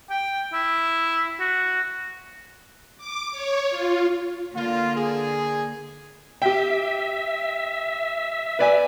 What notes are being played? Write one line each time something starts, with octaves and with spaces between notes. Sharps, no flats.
G5
E4
F#4
D6
C#5
F4
D3 A#3 F4
G#4
G4 E5 G5
B4 D5 G#5